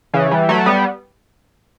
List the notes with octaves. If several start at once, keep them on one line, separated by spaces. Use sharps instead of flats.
C#3 E3
E3 G3
F#3 A3
G3 B3